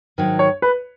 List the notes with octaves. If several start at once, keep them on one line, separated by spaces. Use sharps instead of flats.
G#2 D#3 F#3
C#5
B4